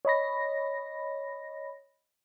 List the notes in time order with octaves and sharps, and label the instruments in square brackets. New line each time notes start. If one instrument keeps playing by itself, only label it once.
[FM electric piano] C#5 D#5 B5 A#6